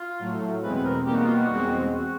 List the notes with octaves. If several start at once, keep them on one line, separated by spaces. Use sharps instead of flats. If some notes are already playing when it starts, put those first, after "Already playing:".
Already playing: F4
A2 F#3 A3
E2 B2 G#3 C4 B4
B4
A#4
B2 G3 A#3 D#4 G4
F#4
F4
F#4
E2 B2 G#3 C4
F#4